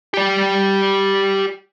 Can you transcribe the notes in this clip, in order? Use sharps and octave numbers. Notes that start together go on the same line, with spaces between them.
G4 D5